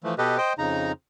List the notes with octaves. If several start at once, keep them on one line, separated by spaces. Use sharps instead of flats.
E3 F3 A3
B2 G4 A4 B4 D#5
C5 D#5 G5
F2 C#3 D#4 A#5